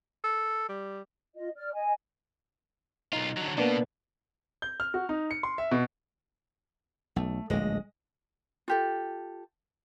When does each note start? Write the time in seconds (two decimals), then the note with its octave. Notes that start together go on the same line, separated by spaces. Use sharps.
0.24 A4
0.69 G3
1.35 F4 D#5
1.56 D5 F6
1.73 D#5 G#5
3.13 B1 D#4 F4
3.37 D3 F#3
3.58 B2 A#3 B3 D4
4.62 G6
4.80 F6
4.94 F#4
5.09 D#4
5.31 C#7
5.43 C6
5.58 E5
5.71 B2
7.16 B1 A3
7.50 D1 A#1 G#3 D#5
8.68 F4 G4 A4